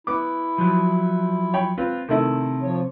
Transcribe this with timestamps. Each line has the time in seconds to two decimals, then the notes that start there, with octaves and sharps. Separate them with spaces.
0.07 B3 E4 D6
0.58 F3 F#3
1.54 C#5 G5 B5
1.78 C4 F4 B4
2.09 C3 D#3 A3 E4
2.63 F3 C#5